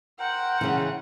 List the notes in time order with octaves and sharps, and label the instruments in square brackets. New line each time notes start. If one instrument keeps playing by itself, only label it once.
[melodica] A#4 C5 G5 [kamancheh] F#5
[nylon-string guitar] C#3 E3